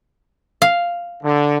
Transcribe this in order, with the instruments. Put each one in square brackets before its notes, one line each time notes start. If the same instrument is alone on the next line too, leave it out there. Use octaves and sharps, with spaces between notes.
[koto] F5
[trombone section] D3